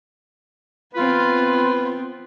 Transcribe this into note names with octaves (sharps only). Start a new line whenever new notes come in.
B3 C4 F4 B4